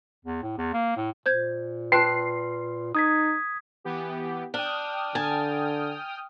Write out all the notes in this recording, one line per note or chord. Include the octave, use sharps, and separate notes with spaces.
E2
A2
E2
A#3
A2
A#2 C5 G6 G#6
B4 G5 A5 C6 F#6 C7
D#4 D#6 G#6 B6
E3 B3 G4
D4 G5 D#6 F6
D3 G#5 A5